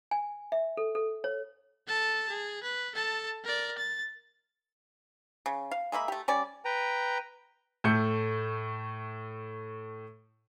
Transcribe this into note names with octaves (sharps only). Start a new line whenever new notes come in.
G#5
E5
A4
A4
C#5
A4 A5
G#4
B4
A4 A5
A#4 D5
A6
C#3
F5
G#3 A#3 E5 B5
A3 G4
G3 C#4 D5
B4 G5 A#5
A2 A3 G6 C#7